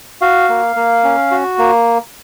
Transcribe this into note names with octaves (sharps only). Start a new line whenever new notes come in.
F#4 F5
A#3
A#3
C#4
F#4
A#3